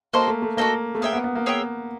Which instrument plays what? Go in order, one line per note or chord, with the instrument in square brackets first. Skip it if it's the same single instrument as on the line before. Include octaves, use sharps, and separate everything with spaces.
[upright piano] A#3 [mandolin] F#4 A4 C5 D#5
[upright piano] A3
A3
[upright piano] A#3 [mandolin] F#4 A4 C5 D#5
[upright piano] A3
[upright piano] A#3 [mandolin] G#4 C#5 E5 G5
[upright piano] B3
B3
A#3
[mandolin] G#4 C#5 E5 G5